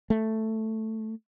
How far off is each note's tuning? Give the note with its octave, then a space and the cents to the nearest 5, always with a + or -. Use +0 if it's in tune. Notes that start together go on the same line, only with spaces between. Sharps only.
A3 +5